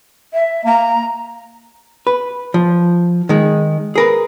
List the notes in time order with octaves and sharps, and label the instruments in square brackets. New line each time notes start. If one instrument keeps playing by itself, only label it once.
[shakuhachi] E5
[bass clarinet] A#3 [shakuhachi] A#5
[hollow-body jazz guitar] B4
F3
D#3 G#3
G#4 A#4 B4